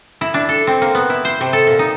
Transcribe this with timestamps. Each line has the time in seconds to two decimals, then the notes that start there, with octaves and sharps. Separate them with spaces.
0.21 E4
0.34 D4
0.49 A4
0.67 C4
0.82 A#3
0.95 B3
1.10 E4
1.25 C5
1.41 C3
1.53 A4
1.67 A#2
1.79 D#4